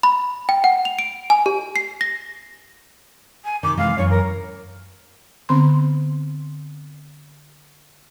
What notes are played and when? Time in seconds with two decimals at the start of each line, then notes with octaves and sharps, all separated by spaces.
0.03 B5
0.49 G5
0.64 F#5
0.85 F7
0.99 D7
1.30 G#5
1.46 G4
1.76 C7
2.01 A#6
3.44 G#5
3.63 C3 D#3 D6
3.77 C3 E3 G#3 F5
3.98 F#2 E3 C#5
4.10 A#4
5.49 D3 B3 C4 B5 C6